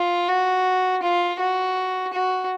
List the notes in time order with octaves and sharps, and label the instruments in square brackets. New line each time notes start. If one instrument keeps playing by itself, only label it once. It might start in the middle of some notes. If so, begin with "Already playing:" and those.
Already playing: [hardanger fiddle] F4
F#4
F4
F#4
F#4